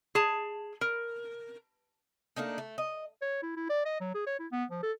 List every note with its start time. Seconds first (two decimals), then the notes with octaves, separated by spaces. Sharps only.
0.15 G#4 A5
0.81 A#4
2.36 A3 A#3 D4 D#4
2.58 A3
2.78 D#5
3.22 C#5
3.42 E4
3.57 E4
3.70 D5
3.85 D#5
4.01 F#3
4.14 G#4
4.27 C#5
4.39 E4
4.52 B3
4.71 F3
4.83 A4